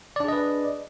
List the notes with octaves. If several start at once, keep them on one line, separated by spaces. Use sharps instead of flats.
D4 G#4 B4 D5 D#5